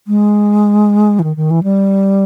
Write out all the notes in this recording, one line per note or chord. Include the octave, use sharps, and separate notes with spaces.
G#3
E3
D#3
D#3
E3
G3